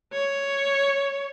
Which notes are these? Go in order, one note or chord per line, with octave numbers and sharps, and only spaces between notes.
C#5